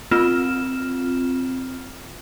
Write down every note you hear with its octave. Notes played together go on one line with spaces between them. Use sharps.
C4 F4 F6 E7